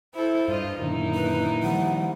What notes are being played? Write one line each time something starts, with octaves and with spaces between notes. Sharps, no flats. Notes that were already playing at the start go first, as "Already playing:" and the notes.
E4 A4 C5
G2 F4 D#5
F#2 A#2 D3 D#3 D#4 E4
B4
D#3 F3 G3 F#5